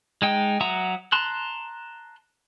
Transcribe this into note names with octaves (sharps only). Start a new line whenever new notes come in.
G#3 D#4 G5
F#3 E5 F#5 A#5 D#6
A5 A#5 C6 F#6